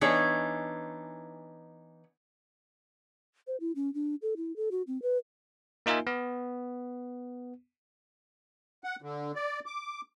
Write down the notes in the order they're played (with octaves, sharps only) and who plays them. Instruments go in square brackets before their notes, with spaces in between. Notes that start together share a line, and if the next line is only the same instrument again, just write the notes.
[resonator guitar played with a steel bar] E3 B3 D4 D#4 G#4 C#5
[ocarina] C5
E4
C#4
D4
A4
E4
A4
F#4
C4
B4
[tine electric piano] A#3 D#4 F4 A#4 E5 G#5
B3
[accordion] F#5
D3
D5
D6